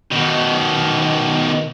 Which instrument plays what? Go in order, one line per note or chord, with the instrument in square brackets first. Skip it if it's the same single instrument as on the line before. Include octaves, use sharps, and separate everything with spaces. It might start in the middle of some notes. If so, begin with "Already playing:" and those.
[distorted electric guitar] B2 D#3